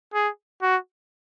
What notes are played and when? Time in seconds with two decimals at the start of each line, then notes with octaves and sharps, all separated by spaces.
0.14 G#4
0.62 F#4